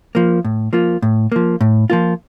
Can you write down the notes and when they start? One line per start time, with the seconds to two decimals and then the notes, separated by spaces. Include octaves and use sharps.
0.15 F3 A#3
0.44 A2
0.73 F3 A#3 F4
1.02 A2
1.32 F3 A#3
1.61 A2
1.90 F3 A#3 F4